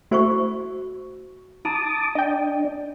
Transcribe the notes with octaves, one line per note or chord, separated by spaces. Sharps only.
A3 E4 F#4 C5 C#6
D#4 A5 A#5 D6 D#6
D4 D#5 G5